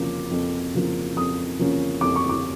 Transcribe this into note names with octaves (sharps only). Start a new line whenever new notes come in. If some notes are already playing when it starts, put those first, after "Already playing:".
Already playing: F2 C#3 F3 A#3 C#4 D6
F2
C#3 F3 A#3 C#4
F2 D#6
C#3 F3 A#3 C#4
F2 D6
C#6
D6